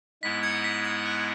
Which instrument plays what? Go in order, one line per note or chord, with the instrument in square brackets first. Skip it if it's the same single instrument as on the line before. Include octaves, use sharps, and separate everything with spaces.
[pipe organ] G#2 G#3 B3 E4 [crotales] B6
[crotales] G#6 C#7
B6
G#6
F#6